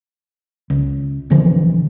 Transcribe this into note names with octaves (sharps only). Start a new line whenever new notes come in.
C#2
B1 D3 E3 F3